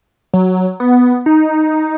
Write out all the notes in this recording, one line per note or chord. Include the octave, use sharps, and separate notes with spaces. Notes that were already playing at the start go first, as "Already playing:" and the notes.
F#3
B3
D#4